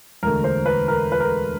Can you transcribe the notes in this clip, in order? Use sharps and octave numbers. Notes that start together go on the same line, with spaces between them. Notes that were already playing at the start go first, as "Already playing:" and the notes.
E1 D2 D3 A#4
C5
B4
A#4
B4
A#4